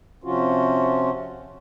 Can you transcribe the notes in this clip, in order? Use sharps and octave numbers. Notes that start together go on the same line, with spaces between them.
C3 F3 C#4 F4 F#4